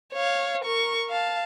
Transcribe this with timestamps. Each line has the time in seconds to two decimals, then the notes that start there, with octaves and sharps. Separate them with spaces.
0.13 C#5 F5
0.64 A#4 C#6
1.09 F5 A5